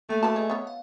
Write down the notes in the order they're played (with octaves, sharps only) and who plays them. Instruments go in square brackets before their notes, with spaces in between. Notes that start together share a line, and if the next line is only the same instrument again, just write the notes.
[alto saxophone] A3 [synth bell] A#3 G5 D#7
[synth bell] F#4 G#5 D6 [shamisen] B4 A5
[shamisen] G#4 [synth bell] D#5
[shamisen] B3 C#5
[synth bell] F5